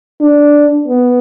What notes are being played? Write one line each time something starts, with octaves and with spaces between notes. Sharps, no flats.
D4
B3